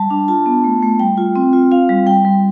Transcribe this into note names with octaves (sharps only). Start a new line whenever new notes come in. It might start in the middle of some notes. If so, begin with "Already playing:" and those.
Already playing: G3 A5
D4
F4 A5
B3
A3
A3
G3 G5
F4
C4
F4
F4 F5
G3
G3 G5
G3